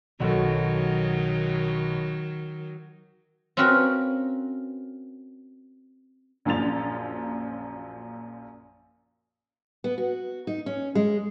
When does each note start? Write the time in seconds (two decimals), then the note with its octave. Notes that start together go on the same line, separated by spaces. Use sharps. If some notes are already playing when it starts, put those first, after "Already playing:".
0.20 B1 D#3 F#3 F#4 A4
3.57 C4 C#4 F4 F#4 A#4 B4
6.45 A#1 F#2 A#2 F3 A6 F7
9.84 B3
9.98 F#4
10.47 D#4
10.66 C#4
10.95 G#3